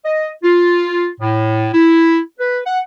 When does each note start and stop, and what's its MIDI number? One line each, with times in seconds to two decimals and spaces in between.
0.05 0.28 75
0.43 1.08 65
1.20 1.67 45
1.73 2.18 64
2.40 2.60 71
2.65 2.79 78